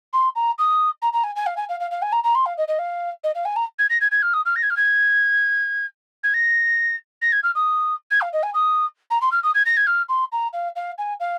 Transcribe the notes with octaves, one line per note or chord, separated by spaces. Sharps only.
C6
A#5
D#6
A#5
A#5
G#5
G#5
F5
G#5
F5
F5
F5
G#5
A#5
A#5
C6
F5
D#5
D#5
F5
D#5
F5
G#5
A#5
G#6
A#6
G#6
G#6
F6
D#6
F6
A#6
G#6
F6
G#6
G#6
A#6
A#6
G#6
F6
D#6
G#6
F5
D#5
G#5
D#6
A#5
C6
F6
D#6
G#6
A#6
G#6
F6
C6
A#5
F5
F5
G#5
F5